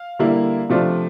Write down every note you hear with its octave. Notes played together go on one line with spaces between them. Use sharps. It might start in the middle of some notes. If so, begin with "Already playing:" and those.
Already playing: F5
D3 G3 A#3 E4
C3 F3 A3 D4 F4